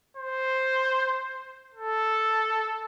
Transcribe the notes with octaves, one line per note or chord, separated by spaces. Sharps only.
C5
A4